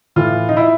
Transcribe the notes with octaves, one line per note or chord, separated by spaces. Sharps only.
A2 E3 F4
D#4
E4